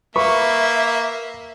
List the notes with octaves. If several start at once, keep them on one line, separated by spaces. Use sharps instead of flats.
A#3 B4 E5 C#6